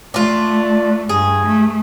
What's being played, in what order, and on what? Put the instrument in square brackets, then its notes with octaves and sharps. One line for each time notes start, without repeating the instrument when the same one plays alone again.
[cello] A3 [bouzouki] D4 F4
[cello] G2 [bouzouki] G#4
[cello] A3